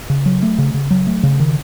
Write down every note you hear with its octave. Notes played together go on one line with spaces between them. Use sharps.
C#3
F#3
A3
C#3
C#3
F#3
A3
C#3
D#3